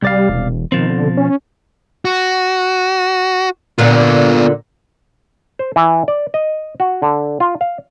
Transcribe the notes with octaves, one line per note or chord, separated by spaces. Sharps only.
C2 G3 D5 F5
E1
B2 D#3 F3 C4
D3
C#4
F#4
A#2 D3 B3 F4
C5
E3
D5
D#5
F#4
D3
F4
F5